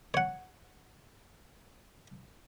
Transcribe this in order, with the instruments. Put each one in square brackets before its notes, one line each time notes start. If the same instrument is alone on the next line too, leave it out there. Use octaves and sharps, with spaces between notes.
[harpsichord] C#5 F#5